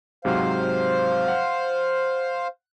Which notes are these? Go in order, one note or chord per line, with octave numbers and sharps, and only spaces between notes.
G#2 C3 F#3 C5 F5
F#5